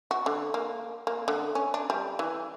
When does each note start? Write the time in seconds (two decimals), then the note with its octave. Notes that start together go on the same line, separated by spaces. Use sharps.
0.11 F#4
0.26 D3
0.54 A#3
1.07 A#3
1.28 D3
1.55 C#4
1.74 D4
1.90 G3
2.19 E3